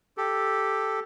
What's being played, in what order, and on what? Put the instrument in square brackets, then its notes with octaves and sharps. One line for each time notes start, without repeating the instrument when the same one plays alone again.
[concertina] G4 A4